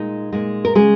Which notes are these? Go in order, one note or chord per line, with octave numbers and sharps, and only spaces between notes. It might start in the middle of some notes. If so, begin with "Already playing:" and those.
Already playing: A#2 G#3 D#4
A#2 G#3
A#4
C#3 G#3 G#4